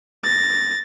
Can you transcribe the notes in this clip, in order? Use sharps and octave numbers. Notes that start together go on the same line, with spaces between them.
A6 A#6